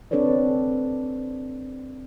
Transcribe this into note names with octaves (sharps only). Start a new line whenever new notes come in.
C4 D4 A4 B4 C#5 D5